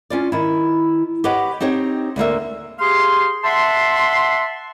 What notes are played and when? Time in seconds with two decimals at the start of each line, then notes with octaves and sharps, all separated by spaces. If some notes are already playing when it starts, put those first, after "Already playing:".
0.10 C#4 F4 D5
0.32 D#3 E4
1.24 G4 B4 C#5 D#5 F#5
1.61 C4 D#4 G4 C#5
2.16 D2 D3 A#3 E5
2.79 G4 G#4 F5 C6
3.44 E5 F#5 A5 C6